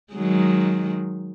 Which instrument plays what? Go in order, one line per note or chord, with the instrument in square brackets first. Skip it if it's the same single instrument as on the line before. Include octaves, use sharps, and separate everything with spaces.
[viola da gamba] D#3 F#3 G#3